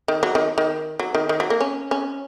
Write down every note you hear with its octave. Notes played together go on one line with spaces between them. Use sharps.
D#3
F#3
D#3
D#3
F#3
D#3
D#3
F#3
A#3
C#4
C#4